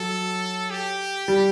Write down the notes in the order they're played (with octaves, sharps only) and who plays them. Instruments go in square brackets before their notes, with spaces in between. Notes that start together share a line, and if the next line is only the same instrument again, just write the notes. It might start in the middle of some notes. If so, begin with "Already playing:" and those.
Already playing: [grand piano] F#3 [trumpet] A4
[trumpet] G4
[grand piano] G3